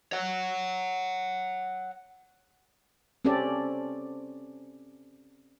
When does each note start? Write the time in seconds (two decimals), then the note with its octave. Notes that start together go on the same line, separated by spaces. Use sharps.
0.12 C#5 F#5
3.25 C4 C#4 G4 A4 D5